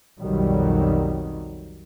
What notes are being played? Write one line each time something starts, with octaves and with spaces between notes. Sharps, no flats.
B1 F2 D#3 F#3 G3